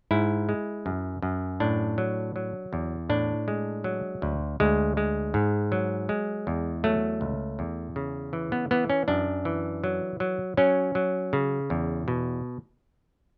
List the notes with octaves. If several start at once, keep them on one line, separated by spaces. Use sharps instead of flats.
G#2 E4
G#3
F#2
F#2
A2 D4
F#3
F#3
E2
A2 D4
G#3
F#3
D2
D2 G#3
G#3
G#2
F#3
G#3
E2
F#3 A3
C#2
E2
C#3
E3
B3
E3 B3
C#4
F#2 D4
E3
F#3
F#3
F#3 C#4
F#3
C#3
E2
B2